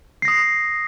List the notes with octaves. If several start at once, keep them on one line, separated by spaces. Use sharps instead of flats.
D#6 A#6 C7